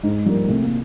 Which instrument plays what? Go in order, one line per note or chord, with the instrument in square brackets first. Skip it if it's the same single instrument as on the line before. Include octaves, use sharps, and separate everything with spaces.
[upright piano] G#2 [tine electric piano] G#3
[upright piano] F3 A#3 [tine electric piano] G3
[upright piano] C2 [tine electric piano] A3
[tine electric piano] A#3